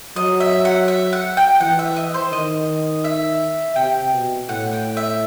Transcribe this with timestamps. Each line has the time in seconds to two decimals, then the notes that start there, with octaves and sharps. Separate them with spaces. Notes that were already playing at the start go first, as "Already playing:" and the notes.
0.16 F#3 D#5
0.40 E5
0.65 F#5
0.88 E5
1.13 F#5
1.37 G5
1.60 E3 F#5
1.79 E5
1.96 D#5
2.14 C5
2.32 D#3 D#5
3.04 E5
3.76 C3 G5
4.13 B2
4.48 A2 F#5
4.73 G5
4.97 E5